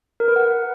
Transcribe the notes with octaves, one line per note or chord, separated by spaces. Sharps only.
A#4
B4
F#5